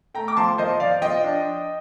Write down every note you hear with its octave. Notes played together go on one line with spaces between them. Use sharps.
A3 G5 A#5
D6
F3 A5 C6
F3 C5 D#5
F3 D5 F5
F3 D#5 G5
D4